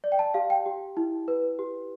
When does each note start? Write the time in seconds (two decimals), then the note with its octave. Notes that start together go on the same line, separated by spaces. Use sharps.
0.04 D5
0.12 G5
0.19 A5
0.34 G4 F5
0.50 G5
0.66 G4
0.97 E4
1.28 B4
1.59 G4